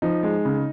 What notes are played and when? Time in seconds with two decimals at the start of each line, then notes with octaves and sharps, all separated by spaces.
0.02 F3 D#4
0.23 G#3
0.45 C#3